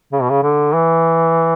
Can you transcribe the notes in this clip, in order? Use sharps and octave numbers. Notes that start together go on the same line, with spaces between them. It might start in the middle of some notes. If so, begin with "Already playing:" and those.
C#3
B2
C#3
D3
E3